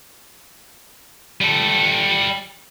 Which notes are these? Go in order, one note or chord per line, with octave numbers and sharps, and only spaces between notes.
G3 A4